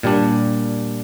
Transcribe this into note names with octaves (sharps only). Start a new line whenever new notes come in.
A#2 G3 D4